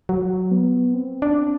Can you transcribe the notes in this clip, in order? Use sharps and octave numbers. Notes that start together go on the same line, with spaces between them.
F#3
B3
C4
D4